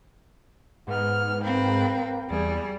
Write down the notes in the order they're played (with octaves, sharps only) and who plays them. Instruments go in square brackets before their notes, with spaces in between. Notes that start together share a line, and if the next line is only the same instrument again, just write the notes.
[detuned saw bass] G#2 [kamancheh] B3 F6
[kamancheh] A#3 G5 [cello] C4 B4
[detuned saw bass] E2 [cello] G3 [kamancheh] G#4